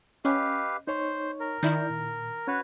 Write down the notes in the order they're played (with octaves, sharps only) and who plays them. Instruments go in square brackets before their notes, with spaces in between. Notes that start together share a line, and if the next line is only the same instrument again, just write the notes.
[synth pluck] C#4 [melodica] G4 B4 F5 [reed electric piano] D#5
[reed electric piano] D#4 C#5 C#6 [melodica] C5
[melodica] A#4
[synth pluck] D#3 E4 [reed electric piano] D5 G6
[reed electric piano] A#2
[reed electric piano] C#4 [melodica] F#4 B4 C#5